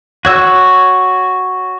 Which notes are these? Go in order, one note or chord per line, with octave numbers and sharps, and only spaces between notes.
F#4 C#5 E6